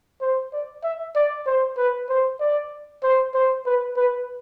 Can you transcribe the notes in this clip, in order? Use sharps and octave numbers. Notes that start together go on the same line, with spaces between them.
C5
D5
E5
D5
C5
B4
C5
D5
C5
C5
B4
B4